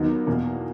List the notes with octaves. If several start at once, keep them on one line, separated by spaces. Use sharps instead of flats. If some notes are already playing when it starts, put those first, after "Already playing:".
Already playing: D#2 D#3 F#3 B3 D#4
E2 B2 A#3